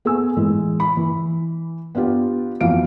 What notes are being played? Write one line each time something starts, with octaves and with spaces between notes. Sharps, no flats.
B3 G#4 A4 G#5 E6
A2 E3 G#3
B5
E3
B3 D4 F4 G4
F2 E3 B3 F#4 F5 D7